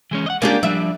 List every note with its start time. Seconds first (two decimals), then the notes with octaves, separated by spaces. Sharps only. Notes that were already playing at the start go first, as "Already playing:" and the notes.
0.11 E3 G#3 C#4
0.26 D#5 F#5
0.42 G#3 A#3 C#4 D4 F4 G4
0.63 F3 G3 D4 E5